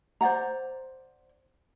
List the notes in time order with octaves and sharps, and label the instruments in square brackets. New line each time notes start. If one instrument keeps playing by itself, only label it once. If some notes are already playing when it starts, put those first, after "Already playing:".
[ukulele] C5 D5 F#5 A#5